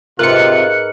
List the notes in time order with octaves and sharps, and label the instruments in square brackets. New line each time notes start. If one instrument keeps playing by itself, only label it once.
[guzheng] G#2 [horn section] C3 F4 [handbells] A#4 B4 [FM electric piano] F#6 C#7